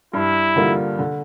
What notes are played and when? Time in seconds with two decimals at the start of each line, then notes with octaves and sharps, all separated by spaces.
0.14 G2 E4
0.56 D3 G3 A#3 F4
0.99 D3